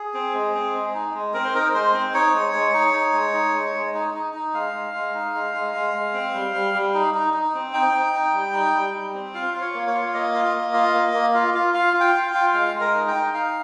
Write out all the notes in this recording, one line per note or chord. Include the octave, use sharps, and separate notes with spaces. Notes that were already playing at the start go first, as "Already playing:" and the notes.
Already playing: G#4
C4
G#3
C4
G#3
D#4
G#3
C4 A#4
C5
D#4 A#4
G#3 C5
C4
D#4 C#5
G#3
G#3
D#4
D#4
G#3
D#4
G#3
G#3
D#4
D#4
D#4
G#3 F5
G#3
G#3
D#4
G#3
G#3
G#3
G#3
C4
G3
G3
G3
D#4
D#4
D#4
C4
D#4 G5
D#4
D#4
G3
D#4
G3
G3
C4
F4 F5
F4
C#5
A#3
C#5
F4
A#3 D#5
F4
A#3
F4
A#3
A#3
F4
F4
F4 F5
F4
G5
F4
G5
F4
G#3 F5
G#3
A#4
D#4
G5
D#4
D#4 F5